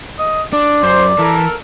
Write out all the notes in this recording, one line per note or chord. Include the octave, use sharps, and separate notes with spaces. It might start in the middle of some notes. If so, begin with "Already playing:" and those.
D#5
D4 D5
F#2 C5
E3 A4 A#4